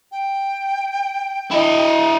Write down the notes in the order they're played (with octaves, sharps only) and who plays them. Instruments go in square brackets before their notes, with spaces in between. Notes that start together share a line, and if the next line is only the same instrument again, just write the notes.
[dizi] G5
[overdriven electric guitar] E4 D#5